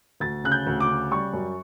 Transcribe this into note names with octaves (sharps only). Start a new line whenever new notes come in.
D2 A6
C#3 F#6
G6
D2
D6
C#3
G3 C#6
F#2